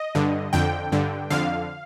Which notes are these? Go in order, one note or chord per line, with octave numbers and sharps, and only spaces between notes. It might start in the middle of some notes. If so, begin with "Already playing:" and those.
Already playing: D#5
G2 D3
F2 D3 G5
G2 D3
F2 D3 F5